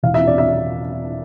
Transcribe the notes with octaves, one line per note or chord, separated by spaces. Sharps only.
E1 F5
E5
D5
E5